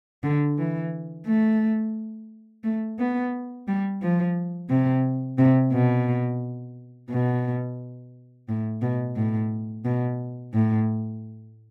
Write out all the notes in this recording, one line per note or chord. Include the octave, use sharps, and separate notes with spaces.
D3
E3
A3
A3
B3
G3
F3
C3
C3
B2
B2
A2
B2
A2
B2
A2